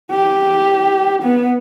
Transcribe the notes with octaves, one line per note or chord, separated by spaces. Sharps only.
G4
B3